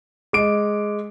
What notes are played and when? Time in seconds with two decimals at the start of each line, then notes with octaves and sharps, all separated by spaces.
0.33 G#3 D#5 D6 D7